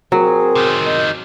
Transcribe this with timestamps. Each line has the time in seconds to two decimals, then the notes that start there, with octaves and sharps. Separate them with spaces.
0.12 F#3 C4 G#4 A#4
0.55 C3 D#3
0.85 D#5